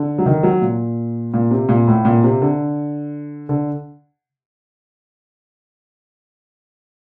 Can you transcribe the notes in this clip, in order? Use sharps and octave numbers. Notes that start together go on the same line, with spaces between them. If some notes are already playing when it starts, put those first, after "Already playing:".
Already playing: D3
F#3
D#3
F#3
A#2
A#2
C3
A#2
A2
A#2
C3
D3
D3